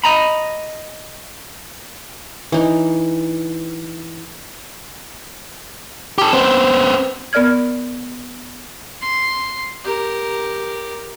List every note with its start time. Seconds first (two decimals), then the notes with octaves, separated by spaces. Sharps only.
0.04 D#5 A#5 B5
2.52 E3 D#4
6.18 G4 A4
6.33 B3 C4
7.33 B3 A#4 D5 F6 G#6
9.02 C6
9.84 G4 A#4